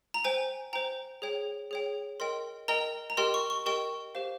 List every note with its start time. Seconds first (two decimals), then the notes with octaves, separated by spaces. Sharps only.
0.14 A#5
0.24 C5 G5 G#5
0.73 C5 G5 A#5
1.22 G#4 C#5 G5
1.71 G#4 C#5 G5
2.20 A#4 D#5 G5 C6
2.68 A#4 D#5 G5 A#5
3.10 A#5
3.17 G4 A#4 D#5 G5 C6
3.34 C#6
3.50 C#6
3.66 G4 A#4 D#5 G5 C#6
4.15 G4 C5 F5